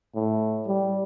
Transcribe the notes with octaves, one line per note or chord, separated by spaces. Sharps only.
A2
G3